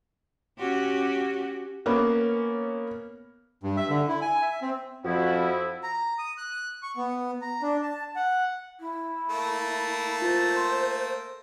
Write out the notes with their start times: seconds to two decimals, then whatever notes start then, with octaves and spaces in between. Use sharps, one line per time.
0.58 C#4 F#4 G4
1.86 A#3 B3 C#4
3.63 G2
3.77 E5
3.90 D3
4.08 E4
4.22 G#5
4.42 E5
4.62 C4
5.05 F2 F3 E4 F#4
5.83 A#5
6.19 D#6
6.38 F#6
6.83 C#6
6.97 B3
7.42 A#5
7.62 D4
7.83 A5
8.16 F#5
8.80 E4
9.30 A3 A#3
10.22 F4 C5 A6
10.57 C6